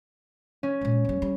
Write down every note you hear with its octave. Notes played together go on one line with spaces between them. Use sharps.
C#4
A#2 G#3
E2 G3
G3